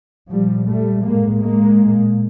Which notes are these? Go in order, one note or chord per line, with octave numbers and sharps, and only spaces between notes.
A#2 F3 G3
G3 A3
A2 G#3 A#3
G#3 A#3
A#2